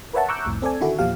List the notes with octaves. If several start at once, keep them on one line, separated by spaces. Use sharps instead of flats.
A#4 B4 C#5 E5 F#5 A5
A#5 C#6 D6 E6 F#6 G6
C2 F2 A2
C4 A4 D5 G#5
D3 D#3 E4 F#4 A4
E2 A#2 F3 G4 F5